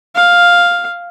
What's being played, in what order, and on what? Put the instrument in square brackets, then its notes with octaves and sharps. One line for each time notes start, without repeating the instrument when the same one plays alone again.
[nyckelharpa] F5